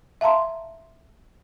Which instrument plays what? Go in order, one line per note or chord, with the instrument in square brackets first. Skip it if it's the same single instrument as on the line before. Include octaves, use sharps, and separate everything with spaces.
[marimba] E5 F5 A5 A#5 C6